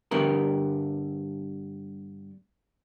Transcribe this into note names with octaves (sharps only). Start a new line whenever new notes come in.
G2 D3 G3 B3 A#4